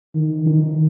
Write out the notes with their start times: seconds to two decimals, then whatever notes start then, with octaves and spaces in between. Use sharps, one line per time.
0.15 D#3
0.46 D#3